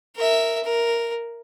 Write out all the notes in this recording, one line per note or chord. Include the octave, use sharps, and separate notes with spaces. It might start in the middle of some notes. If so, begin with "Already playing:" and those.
A#4 E5
A#4